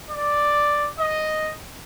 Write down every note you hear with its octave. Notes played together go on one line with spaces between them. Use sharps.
D5
D#5